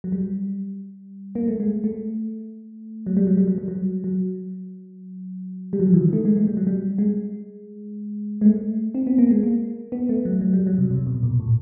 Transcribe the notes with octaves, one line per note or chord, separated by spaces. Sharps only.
F#3
G3
A#3
A3
G#3
A3
F#3
G3
F#3
G3
F#3
G3
F#3
F#3
G3
F#3
F3
E3
D#3
A3
G#3
G#3
G3
F#3
G3
G#3
G#3
A3
C4
B3
A#3
G#3
A#3
B3
A3
F#3
F#3
G3
F#3
C3
C3
B2
A#2
A2